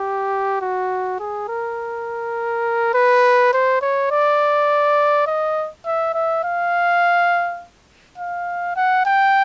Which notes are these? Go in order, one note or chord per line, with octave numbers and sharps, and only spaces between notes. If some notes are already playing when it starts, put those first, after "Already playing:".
Already playing: G4
F#4
G#4
A#4
B4
C5
C#5
D5
D#5
E5
E5
F5
F5
F#5
G5